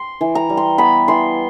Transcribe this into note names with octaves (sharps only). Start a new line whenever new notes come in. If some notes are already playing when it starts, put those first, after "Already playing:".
Already playing: C6
E3
A#5
G3
C6
B3 B5
E3 C6